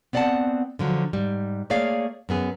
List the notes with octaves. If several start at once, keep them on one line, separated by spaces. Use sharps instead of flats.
B3 C4 D5 F5 F#5 A5
D3 F3 F#3
G#2 G3
A3 A#3 G#4 C#5 D5 F5
F#2 B3 G#4